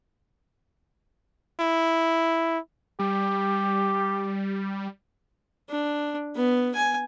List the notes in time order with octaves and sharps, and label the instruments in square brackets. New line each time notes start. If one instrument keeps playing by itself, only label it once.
[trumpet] E4
[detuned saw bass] G3 [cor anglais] G4
[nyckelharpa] D4
B3
G#5